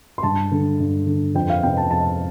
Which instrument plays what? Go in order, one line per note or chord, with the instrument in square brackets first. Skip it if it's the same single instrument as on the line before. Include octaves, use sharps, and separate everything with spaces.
[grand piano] C6
G2 A5
D3
G2
D3
F2 G5
F5
C3 G5
A5
F2 A5